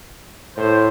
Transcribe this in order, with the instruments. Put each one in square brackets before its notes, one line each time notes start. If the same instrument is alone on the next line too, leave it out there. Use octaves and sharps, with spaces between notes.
[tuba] A2 [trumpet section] C5